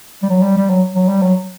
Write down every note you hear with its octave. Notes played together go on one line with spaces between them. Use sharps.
G3
F#3
G3
G3
F#3
F#3
G3
F#3